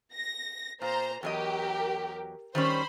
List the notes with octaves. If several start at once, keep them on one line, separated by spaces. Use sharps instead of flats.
A#6
A#2 C5 A#5
E2 F#3 G4 A#4 D#5
D#3 G3 C#4 C5 B5